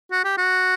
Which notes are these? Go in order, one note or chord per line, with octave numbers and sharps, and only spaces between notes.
F#4
G4
F#4